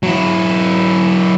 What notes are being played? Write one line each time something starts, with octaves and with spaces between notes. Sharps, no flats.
F#3 E4